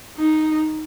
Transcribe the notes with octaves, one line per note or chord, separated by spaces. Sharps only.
D#4